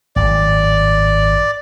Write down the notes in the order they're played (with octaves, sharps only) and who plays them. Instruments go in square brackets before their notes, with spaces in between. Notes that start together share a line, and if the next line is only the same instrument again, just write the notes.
[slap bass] G#1 F#2 A2 [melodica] D5